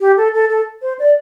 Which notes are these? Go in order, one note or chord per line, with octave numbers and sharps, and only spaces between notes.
G4
A4
A4
A4
C5
D5